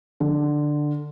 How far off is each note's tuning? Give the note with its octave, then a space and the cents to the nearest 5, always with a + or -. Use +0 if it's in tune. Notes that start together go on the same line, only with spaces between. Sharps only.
D3 +10